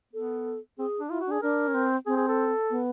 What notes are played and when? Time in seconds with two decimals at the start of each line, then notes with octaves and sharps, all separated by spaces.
0.13 B3 A4
0.78 C4 G#4
1.00 D4
1.10 E4 F4
1.20 F#4
1.27 D4 G#4
1.42 D4 A#4
1.68 C#4
1.74 C4
2.06 C4 G#4
2.17 G#4
2.28 A4
2.70 B3